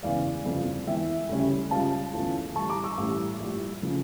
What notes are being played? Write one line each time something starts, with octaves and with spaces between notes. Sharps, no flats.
E1 E2 C#3 D5 F5
G1 F2 C#3 F3
E1 E2 E3 E5 G5
D2 C#3 G3 C#4
C#2 C#3 G3 C#4 F4 F5 A5
E2 D3 A3 C#4 F4
A2 E3 G3 A5 C#6
A#5 D6
C#6 E6
A1 A2 G3
A#1 A2 G3
C#3 F3 A3